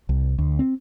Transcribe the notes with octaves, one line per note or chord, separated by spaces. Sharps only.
C2
D2
C4